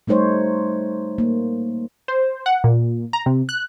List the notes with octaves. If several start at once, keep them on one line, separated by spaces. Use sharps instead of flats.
G3 A3 D#4 C5 C#5
A#3
C5
F#5
A#2
A#5
C3
F#6